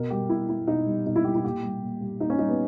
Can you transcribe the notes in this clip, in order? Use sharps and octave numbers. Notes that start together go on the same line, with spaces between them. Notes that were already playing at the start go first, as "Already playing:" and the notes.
Already playing: B2 A#4
G3 G4
B2 E4
G3 E4
B2 D#4
G3
B2 D#4
E4
G3 G4
E4
A#2 G4
G3
A#2
G3
A#2 D#4
C#4
G3 D#4
B3